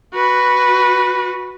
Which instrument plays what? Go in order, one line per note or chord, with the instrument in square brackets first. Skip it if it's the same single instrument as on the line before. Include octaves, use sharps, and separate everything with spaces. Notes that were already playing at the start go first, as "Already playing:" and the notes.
[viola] F#4 B4